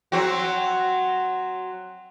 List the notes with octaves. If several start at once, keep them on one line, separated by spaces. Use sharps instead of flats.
F#3 C4 F#4